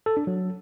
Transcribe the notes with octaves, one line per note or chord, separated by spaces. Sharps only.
A4
D4
F#3